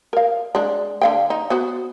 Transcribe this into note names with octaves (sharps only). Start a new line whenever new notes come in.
A#4 F5
G#3 D4
D3 F5 G5
D#4
B3 F#4 C5